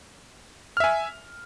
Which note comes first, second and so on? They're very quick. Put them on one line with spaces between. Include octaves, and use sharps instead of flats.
F6 E5 G#5